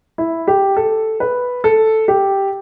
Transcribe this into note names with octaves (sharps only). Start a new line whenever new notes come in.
E4
G4
A4
B4
A4
G4